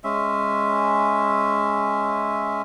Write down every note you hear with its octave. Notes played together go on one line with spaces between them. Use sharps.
G#3 C#4 E5